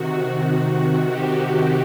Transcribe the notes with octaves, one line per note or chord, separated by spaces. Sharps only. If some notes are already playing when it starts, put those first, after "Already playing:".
Already playing: C3 D#3 F#4
F#4
G4